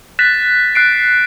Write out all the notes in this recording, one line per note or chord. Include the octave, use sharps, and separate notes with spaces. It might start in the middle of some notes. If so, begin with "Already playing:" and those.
F#6 A6 B6 E7
F#6 C7 D7